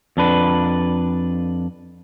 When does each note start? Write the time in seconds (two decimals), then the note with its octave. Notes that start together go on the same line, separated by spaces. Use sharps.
0.17 F2 D4 B4